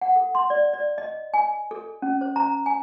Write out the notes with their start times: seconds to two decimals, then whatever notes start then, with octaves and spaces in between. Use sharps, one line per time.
0.01 F#5
0.16 A4
0.35 C6
0.50 D5
0.73 D5
0.98 D#5
1.34 G#5
1.71 A4
2.02 C#4
2.21 C5
2.36 A#5
2.66 G#5